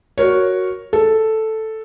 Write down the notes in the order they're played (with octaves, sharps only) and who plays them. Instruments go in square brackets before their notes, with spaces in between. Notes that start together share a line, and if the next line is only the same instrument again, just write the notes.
[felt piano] F#4 A#4 C#5
A4